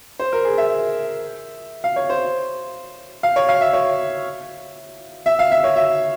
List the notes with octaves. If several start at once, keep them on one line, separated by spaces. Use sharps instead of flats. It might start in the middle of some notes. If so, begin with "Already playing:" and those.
C5
A#4
G#4
E5
F5
C#5
C5
F5
C#5
F5
E5
C#5
E5
F5
E5
C#5
E5